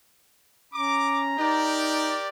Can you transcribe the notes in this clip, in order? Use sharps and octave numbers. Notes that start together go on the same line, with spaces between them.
C#4 A#5 D6
D#4 G4 A#4 D5